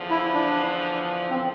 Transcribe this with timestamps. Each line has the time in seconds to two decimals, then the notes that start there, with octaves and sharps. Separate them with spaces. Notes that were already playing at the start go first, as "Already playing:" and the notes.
Already playing: E2 D3 F3
0.11 E4
0.34 D4
1.31 C4